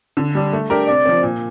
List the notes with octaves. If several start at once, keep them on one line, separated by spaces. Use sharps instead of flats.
D3
G3 D4
A3
D4 G4 A#4
C3 D5
F3 C4
A#2